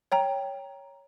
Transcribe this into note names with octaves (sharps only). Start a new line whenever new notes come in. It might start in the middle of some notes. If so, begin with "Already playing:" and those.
C#5 G5 A#5